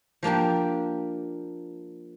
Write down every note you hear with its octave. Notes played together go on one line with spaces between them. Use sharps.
F3 A#3 D4 G4